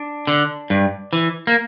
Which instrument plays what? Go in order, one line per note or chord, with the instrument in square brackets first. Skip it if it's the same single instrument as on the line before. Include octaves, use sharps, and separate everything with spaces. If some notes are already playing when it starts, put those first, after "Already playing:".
Already playing: [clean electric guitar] D4
D3
G2
E3
A#3